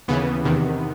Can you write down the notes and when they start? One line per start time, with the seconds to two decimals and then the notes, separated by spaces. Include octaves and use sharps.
0.08 D#2 C#3 E3 B3
0.45 E2 C3 D#3